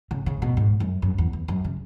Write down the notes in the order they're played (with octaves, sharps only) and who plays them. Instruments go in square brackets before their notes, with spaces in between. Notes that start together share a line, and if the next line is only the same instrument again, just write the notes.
[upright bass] C#3
C#3
B2
G#2
F#2
F#2
E2
E2
F#2
C#3